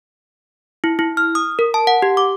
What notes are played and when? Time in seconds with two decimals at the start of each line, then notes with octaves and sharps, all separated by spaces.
0.84 E4
0.99 E4
1.17 F6
1.35 D#6
1.59 A#4
1.74 A5
1.87 F#5
2.02 G4
2.17 D6